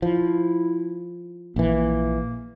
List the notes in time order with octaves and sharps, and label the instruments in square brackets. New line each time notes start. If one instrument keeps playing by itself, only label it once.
[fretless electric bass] F3 [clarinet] E4
[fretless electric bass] A#1 E3 [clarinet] A#3